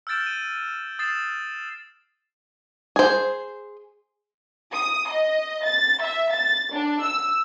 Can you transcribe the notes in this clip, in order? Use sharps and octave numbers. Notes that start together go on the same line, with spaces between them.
E6 F6 G6 A6 D7 E7
D#7
D#7
D#6 A6 C7 E7
G#4 C5
D#6
D#5
A6
E5
A6
D4
E6